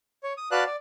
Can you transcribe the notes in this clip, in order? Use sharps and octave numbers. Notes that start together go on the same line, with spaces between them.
C#5
D#6
F#4 B4 D5 F5 A5 F#6
D5